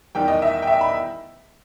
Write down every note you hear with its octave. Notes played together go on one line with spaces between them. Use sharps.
E2 D#3 G3 G5
D#5
E5
G5
E5
B5